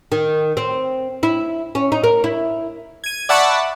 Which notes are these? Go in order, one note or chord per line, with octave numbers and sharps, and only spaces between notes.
D#3
C4
E4
C#4
D#4
A#4
E4
G#6 D#7
D5 E5 F#5 A5 B5 C#6